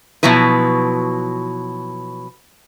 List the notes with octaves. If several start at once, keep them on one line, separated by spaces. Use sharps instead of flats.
B2 F3 F#3 E4 B4